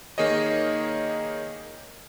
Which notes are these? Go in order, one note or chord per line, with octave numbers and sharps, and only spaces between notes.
D#3 A#3 G#4 C#5 D#5